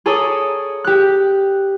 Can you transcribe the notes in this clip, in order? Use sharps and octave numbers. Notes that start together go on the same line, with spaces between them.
G#4 A4 C#5 D5 A#5 D#6
G4 F#6